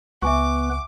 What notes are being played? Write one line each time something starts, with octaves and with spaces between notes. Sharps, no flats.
C#2 B3 B4 E5 G#5 C#6 D6